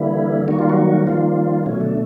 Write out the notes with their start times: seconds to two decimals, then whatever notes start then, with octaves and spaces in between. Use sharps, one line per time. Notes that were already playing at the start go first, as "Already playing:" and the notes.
Already playing: D3 E3 G3 A#3 E4
0.48 D#3 G3 A#3 F#4
0.59 F4
0.70 F#3 F#4
1.07 D#3 F3 G3 A#3 F4
1.66 B2 F#3 A3 C#4
1.81 D3 D4